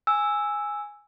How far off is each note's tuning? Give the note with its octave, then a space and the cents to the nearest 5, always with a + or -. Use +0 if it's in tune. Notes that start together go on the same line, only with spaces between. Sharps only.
G#5 +0 E6 +0